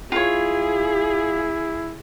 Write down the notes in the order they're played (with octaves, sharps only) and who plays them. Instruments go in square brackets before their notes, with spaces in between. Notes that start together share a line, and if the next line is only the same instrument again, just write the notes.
[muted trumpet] E4 [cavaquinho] F4 C#5 [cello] G#4